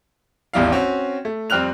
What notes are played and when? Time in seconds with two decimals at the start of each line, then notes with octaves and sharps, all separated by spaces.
0.53 D#1 G#1 E2 G3 E4 F5
0.72 C4 C#4 F#4
1.25 A3
1.50 F2 G3 C4 F6 F#6 F7